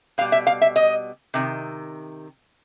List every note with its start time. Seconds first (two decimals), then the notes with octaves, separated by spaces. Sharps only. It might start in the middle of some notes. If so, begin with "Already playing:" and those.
0.18 B2 G3 F5
0.32 E5
0.47 F5
0.62 E5
0.76 D#5
1.34 C3 D#3